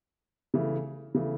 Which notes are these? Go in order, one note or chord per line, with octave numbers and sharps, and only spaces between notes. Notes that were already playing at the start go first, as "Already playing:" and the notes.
C#3 E3 A3
C#3 E3 A3